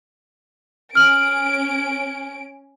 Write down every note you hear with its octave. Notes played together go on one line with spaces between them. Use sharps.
C#4 F6 D7 F#7